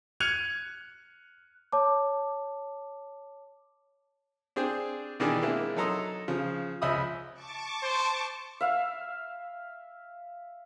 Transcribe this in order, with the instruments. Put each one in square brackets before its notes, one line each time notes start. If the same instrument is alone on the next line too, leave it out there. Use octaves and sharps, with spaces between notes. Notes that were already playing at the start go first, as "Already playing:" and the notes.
[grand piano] F6 F#6 G#6 C#7 D#7 F7
[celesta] C#5 A5 D6
[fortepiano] C4 D4 G#4 C5 G5
B2 D#3 E3 D4 G4 G#4
G#3 A#3 C4 D4 E4
F#3 D#4 A4 A#5 C6 D#6
C#3 F3
C#2 F3 D#5 E5 B5 D#6
[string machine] A5 C#6 D6
[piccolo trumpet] C5
[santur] E5 F5